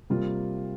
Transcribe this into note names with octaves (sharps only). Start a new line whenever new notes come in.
C3 G3 A#3 F4